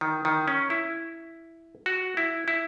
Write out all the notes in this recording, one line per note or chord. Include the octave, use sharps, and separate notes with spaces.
D#3
D#3
C#4
E4
F#4
E4
E4